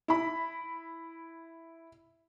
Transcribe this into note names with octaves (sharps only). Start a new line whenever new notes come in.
E4 B5